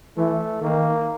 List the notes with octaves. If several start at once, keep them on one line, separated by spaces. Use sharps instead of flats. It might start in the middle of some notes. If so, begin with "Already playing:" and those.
E3 A3
D#3 A#3